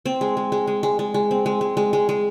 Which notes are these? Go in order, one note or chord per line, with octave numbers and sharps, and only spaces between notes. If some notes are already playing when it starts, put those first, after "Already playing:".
C4
G#3
G#3
G#3
G#3
G#3
G#3
G#3
C4
G#3
G#3
G#3
G#3
G#3